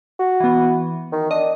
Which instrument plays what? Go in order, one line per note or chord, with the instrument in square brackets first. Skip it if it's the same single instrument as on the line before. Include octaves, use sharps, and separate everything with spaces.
[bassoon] F#4
[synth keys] E3 B3
[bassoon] D#3
[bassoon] D4 [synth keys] D#5